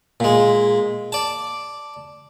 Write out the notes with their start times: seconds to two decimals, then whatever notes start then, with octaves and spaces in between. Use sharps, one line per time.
0.20 A#2 G#3
1.12 D5 A5